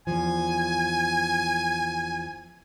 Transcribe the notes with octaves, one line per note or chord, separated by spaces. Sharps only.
E2 F3 G#5